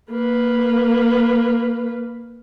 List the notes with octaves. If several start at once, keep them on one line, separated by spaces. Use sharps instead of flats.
A#3 B4